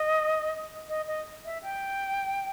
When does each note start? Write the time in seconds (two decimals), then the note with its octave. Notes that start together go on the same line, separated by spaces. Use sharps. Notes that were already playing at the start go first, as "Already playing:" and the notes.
Already playing: D#5
0.89 D#5
1.08 D#5
1.45 E5
1.63 G5